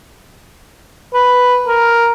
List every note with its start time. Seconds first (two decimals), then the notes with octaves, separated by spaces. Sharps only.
1.14 B4
1.67 A#4